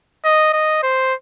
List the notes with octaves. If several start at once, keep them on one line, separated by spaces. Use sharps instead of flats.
D#5
D#5
C5